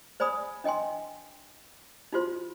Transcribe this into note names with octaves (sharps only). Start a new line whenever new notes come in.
C5 D5 G#5 B5 D#6
D4 D#5 G5 G#5 C6
D#4 F4 F#4 C5 C6